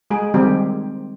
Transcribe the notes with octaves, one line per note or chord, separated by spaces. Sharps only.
G#3 G#4
D#3 G3 G#3 C4 G4